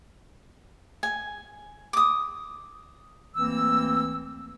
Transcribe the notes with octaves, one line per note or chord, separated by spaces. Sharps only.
G#5
D6 D#6
D2 E3 A#3 C4 E6